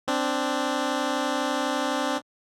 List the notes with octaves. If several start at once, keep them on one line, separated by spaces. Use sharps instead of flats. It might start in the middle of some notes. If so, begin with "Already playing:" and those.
C4 D4